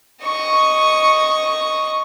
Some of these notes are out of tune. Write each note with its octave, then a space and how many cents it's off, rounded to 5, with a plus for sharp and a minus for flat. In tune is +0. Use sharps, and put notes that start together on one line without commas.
D#5 +0 C#6 +0